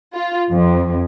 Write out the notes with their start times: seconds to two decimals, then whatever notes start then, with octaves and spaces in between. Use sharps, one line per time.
0.13 F4
0.51 F2